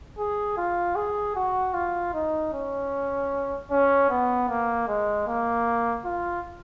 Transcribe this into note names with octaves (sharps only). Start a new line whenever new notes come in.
G#4
F4
G#4
F#4
F4
D#4
C#4
C#4
B3
A#3
G#3
A#3
F4